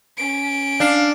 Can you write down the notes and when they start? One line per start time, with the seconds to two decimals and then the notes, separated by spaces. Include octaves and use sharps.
0.18 C#4 D7
0.80 D4 F5